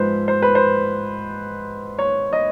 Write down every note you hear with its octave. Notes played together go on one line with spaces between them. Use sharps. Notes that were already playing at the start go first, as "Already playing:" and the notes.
Already playing: G#2 F3 B4 C5
C5
B4
C5
C#5
D#5